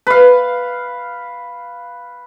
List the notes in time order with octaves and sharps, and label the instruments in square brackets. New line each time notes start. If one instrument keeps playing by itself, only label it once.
[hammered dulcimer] B4 F5